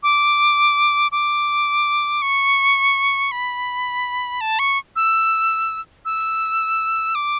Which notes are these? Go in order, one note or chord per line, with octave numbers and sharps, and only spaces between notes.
D6
D6
C#6
B5
A5
C#6
E6
E6
D6